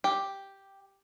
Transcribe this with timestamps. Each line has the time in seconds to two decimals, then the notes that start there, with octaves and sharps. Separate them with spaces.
0.04 G4